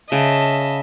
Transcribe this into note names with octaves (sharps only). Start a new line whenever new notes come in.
C#3 D#5 E5 A5